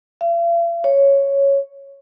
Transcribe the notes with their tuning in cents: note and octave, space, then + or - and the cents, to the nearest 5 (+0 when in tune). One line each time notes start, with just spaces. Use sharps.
F5 -45
C#5 +0